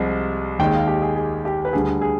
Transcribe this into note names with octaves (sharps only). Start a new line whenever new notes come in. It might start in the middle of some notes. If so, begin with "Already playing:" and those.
Already playing: C2 C3 F3 G#3
D#2 D#3 G#3 G5
F5
G4
G#4
G#4
G4
B4
D2 D3 G3 G#4
G#4